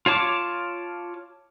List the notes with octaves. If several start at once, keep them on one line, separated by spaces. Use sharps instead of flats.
F4 C#5 A5 D6